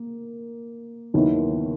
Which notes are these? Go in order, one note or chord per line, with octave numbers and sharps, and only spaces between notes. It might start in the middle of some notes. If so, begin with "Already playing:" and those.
Already playing: A#3
D#2 D#3 F#3 B3 E4